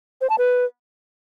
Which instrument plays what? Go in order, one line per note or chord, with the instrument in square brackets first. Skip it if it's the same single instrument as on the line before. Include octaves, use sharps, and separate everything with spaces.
[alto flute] C5
A5
B4